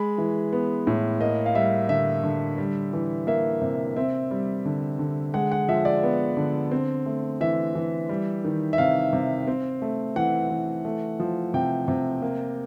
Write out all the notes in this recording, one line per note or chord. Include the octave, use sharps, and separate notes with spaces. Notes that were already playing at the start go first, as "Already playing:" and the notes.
Already playing: G#3 B5
E3
B3
A2
A#3 D#5
F5
G3 E5
D3 E5
D3
G3
E3
A#3 E5
C3
C4 E5
G3
D3
D3
G#3 F#5
F#5
F3 E5
D5
B3
D3
C4
A3
E3 E5
E3
G3
D#3
E5
C3 F5
C3
C4
A3
E3 F#5
E3
A3
F3
C3 G5
C3
A#3